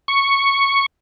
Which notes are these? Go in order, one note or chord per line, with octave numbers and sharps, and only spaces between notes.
C#6